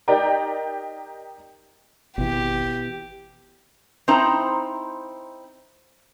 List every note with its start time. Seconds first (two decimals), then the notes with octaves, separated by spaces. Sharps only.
0.08 D#4 G4 A#4 D5 G5 A#5
2.18 G#1 B2 E3 G4
4.08 C4 D#4 E4 C5 A#5